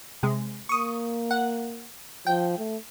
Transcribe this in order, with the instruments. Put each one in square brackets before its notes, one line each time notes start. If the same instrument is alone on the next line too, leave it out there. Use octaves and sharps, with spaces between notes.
[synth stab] C3 G#3
[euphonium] A#3 [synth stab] C#6 D#6
[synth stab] F#5
[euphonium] F3 [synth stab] G5
[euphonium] A3